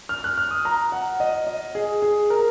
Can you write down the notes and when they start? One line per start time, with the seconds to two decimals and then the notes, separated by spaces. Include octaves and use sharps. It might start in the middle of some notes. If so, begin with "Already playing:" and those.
0.09 F6
0.24 F#6
0.38 F6
0.51 D#6
0.65 A#5
0.92 F#5
1.20 D#5
1.47 D#5
1.75 G#4
2.02 G#4
2.30 A#4